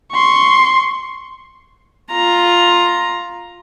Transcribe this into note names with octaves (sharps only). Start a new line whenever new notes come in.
C6 C#6
F4 A#5